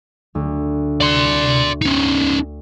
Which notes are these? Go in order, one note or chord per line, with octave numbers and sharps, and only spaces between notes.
D2
D5 C6
C#4 D#4